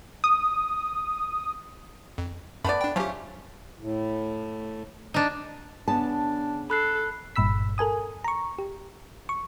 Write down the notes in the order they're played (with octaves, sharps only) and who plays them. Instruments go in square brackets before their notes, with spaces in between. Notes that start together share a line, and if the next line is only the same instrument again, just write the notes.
[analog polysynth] D#6
[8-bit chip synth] F2
[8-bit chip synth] F#2 B5 [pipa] A3 B3 D5
[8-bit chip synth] D4 G5
[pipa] F3 A3 C#4 [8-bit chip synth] F#3 G4
[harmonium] A2
[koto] D4 D#4
[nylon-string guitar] C#3 B3 A5 [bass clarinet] D4
[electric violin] A4 [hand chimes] B5 F#6 C7
[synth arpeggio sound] G1 G2 A#2 B5 E6 B6
A4 A#4 G#5 D#6
A#5 C#6
G4
C#6